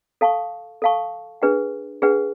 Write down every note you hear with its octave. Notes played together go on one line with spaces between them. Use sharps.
A4 F5 A5 C#6
A4 F5 A5 C#6
D4 G#4 B4 F#5
D4 G#4 B4 F#5